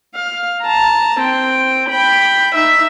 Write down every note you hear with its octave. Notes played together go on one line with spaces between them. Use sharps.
F5
A5 A#5
C4 G5
G5 B5
D#4 E5